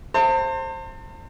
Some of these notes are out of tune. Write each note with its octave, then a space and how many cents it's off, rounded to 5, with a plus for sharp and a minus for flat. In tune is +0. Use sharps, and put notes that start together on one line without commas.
C5 +15 A5 +45